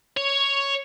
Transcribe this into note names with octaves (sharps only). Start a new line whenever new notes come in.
C#5